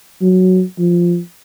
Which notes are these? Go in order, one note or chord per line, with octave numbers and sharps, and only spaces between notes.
F#3
F3